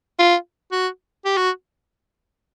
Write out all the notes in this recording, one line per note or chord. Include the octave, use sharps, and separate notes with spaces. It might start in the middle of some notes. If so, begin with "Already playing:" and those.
F4
F#4
G4
F#4